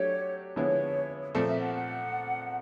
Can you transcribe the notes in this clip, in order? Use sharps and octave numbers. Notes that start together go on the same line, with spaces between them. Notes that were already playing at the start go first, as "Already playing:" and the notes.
Already playing: F#3 A3 D4 G4 C#5
D3 F3 G#3 B3 E4 C#5
A#2 F3 A3 C4 D5
E5
F#5
F#5